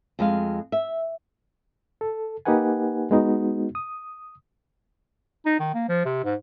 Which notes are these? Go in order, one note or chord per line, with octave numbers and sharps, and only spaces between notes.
F2 G#3 F5
E5
A4
A#3 D#4 G4 B4 F#5 G#5
G#3 B3 D#4 F#4
D#6
D#4
D#3
A#3
F3
C3
G#2